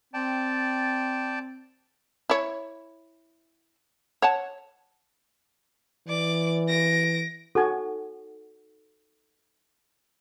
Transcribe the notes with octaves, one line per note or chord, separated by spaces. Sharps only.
C4 D5 G5 A5
E4 C#5
C#5 F#5 A5
E3 D5 D6
A#6 D7
D#4 F#4 A4 G#5